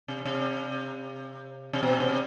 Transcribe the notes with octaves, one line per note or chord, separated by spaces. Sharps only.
C3
C3
C3
B2
C3